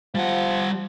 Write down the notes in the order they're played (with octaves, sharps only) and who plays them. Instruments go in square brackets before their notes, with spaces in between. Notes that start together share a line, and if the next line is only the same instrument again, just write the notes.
[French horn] F3 [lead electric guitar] G3 F#5